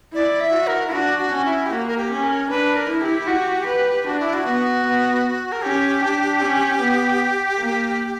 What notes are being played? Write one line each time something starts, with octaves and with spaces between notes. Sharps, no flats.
E4 D5
E5
F#4
A#4
E4
D4 F#4
F#4
C#4
E4
G4
A#3 F#4
A#4
G4
C#4
A#4
D4 B4
A#4
E4
G4
F#4
B4
D4 F#4
E4
F#4
B3
B3
A#4
C#4 G4
D4
C#4
B3
A#3